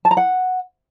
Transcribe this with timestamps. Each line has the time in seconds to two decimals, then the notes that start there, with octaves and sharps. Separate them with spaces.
0.05 A5
0.11 A#5
0.17 F#5